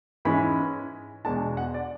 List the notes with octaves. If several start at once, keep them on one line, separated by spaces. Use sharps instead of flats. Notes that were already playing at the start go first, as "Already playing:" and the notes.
G#2 E3 G#3 C#4 B5
E2 B2 G#3 D4 A5
F#5
D5